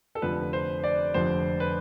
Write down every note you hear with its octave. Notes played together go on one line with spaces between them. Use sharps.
A4
F1 F2 D3 F3 B4
C5
D5
F1 F2 D3 F3 C5
B4